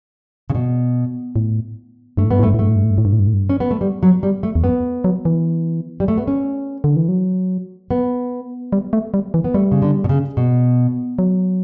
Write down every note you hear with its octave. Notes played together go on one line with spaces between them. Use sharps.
C#3
B2
A2
G2 A3
A2
G2 B3
A2
A3
G2
A2
G2 A3
A2
G2
A2
G2
A2
G2
A2
G2
A2
G2
C#4
B3
A3
G3
F#3
G3
A3
E2
F#2 B3
F#3
E3
G3
A3
B3
C#4
D3
E3
F#3
B3
G3
A3
G3
E3
B3
G3 A3
C#3
D3
B2
C#3
B2
F#3